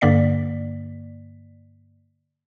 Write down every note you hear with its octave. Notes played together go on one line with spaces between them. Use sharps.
G2 D3 A#3 D5 B6